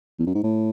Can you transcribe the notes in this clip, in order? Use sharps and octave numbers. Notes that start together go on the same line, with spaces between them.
E2
F#2
G#2
A2